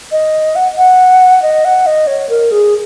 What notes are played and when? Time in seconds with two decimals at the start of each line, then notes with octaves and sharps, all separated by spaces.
0.12 D#5
0.56 F#5
0.78 F#5
1.42 D#5
1.65 F#5
1.86 D#5
2.07 C#5
2.29 A#4
2.52 G#4